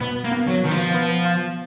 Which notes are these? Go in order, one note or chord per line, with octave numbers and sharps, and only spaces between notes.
B2 B3
A#3
B3
F#3
B2 D#3
F3
B3
F4